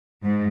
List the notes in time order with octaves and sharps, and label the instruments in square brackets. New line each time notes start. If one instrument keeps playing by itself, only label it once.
[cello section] G#2